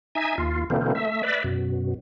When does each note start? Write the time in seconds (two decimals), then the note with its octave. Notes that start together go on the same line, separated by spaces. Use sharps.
0.15 D#4 E5 G#5
0.38 D#2 F4
0.70 B2 D3 E3 A#3 C4
0.95 A3 E5
1.23 B4 D5 E5
1.44 F#2 B2